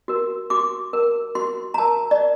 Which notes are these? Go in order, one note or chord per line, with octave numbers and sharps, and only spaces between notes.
F#4 A#4
F#4 D6
A#4
F#4 C6
A#5
A#4 A5
D5